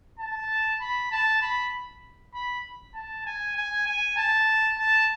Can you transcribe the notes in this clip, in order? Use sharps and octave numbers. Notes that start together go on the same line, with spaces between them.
A5
B5
A5
B5
B5
A5
G#5
G#5
G#5
A5
A5